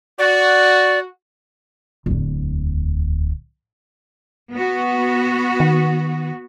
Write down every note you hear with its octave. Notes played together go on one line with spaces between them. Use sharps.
F#4 D5
D1 E2
B3 F#4
D#3